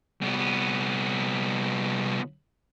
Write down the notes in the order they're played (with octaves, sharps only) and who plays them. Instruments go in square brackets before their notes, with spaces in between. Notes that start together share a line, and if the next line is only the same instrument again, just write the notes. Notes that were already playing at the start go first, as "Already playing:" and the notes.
[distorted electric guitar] C2 B3